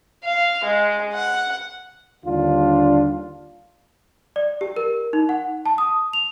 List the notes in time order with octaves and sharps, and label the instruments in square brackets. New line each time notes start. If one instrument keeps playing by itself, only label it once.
[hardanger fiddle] F5
G#3
F#5
[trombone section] D#2 D3 G3 D4 F4
[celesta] D5
G4
A#4
D#4
F#5
A5
D#6
F7